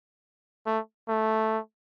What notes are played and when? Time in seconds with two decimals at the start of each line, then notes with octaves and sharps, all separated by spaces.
0.66 A3
1.08 A3